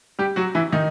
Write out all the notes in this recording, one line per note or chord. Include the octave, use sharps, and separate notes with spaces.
G3 G4
F#3 F#4
E3 E4
D#3 D#4